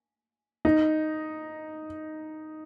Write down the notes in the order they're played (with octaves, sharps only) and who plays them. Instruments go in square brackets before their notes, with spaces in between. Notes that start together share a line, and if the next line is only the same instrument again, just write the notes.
[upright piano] D#4